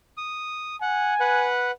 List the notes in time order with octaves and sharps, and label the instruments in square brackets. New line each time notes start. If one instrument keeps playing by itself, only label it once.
[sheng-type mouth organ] D#6
[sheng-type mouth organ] F#5 [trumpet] G#5
[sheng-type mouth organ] B4 F#5